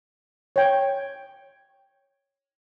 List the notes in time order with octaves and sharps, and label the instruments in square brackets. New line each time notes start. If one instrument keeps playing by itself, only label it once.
[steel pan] C#5 G5